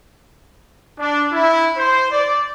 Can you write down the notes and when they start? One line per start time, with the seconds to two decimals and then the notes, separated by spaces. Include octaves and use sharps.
0.99 D4
1.32 E4
1.77 C5
2.12 D5